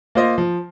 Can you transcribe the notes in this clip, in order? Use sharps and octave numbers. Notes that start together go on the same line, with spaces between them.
A#3 F4 C5 D#5
F3